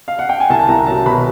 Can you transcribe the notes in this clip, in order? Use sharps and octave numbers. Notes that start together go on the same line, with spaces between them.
F5
F#5
G5
G#5
C2 A5
C2 A#5
F#3 A5
B2 B5